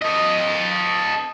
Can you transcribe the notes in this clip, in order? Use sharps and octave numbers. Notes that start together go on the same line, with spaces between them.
A4 D#5